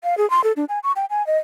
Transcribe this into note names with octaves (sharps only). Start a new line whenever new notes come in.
F5
G#4
C6
A4
D4
G#5
C#6
G5
G#5
D#5